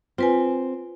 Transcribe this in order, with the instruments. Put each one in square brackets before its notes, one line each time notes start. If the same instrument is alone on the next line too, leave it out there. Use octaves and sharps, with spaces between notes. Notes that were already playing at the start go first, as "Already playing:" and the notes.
[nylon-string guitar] C4 [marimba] F4 B4 G#5